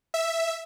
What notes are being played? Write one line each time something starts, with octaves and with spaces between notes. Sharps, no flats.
E5